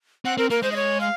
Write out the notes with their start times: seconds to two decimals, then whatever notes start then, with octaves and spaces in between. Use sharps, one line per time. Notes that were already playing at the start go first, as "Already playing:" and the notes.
0.25 C4 F#5
0.37 C4 A#4
0.50 A#3 A#4
0.63 G#3 C5
0.72 D#5
0.76 C#5
1.01 F5